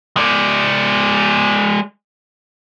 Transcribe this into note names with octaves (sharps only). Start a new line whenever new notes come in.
G#3 D5